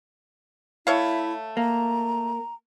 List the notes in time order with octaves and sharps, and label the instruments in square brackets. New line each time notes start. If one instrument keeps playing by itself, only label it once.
[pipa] A3 C#5 F5 [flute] E4
[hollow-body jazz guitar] A#3 [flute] A#5